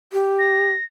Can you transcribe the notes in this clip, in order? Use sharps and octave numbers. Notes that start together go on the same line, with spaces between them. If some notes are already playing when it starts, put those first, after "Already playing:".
G4
A#6